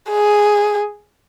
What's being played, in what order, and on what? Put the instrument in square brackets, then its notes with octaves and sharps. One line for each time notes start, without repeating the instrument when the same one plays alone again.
[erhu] G#4